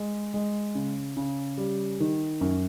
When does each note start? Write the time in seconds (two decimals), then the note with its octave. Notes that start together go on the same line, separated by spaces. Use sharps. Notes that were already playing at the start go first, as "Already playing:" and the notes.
Already playing: G#3
0.34 G#3
0.75 C#3
1.17 C#3
1.58 G3
2.00 D#3
2.41 F#2